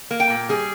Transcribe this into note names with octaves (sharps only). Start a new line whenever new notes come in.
A#3
G5
A#2
G3 G#4